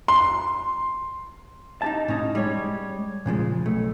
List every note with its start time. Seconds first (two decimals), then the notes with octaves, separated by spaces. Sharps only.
0.08 C6
1.82 D#4 G4 A5
2.08 A2 C#4 D#4
2.35 G3 G#3 C#5
3.26 A#2 C#3 F3 G#3
3.66 B1 A3